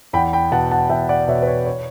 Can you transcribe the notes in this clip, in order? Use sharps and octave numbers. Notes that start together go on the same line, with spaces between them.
E2 G5 B5
G5 B5
B2 F#5 A5
F#5 A5
E2 E5 G5
D5 F#5
B2 C#5 E5
B4
C#5
C#5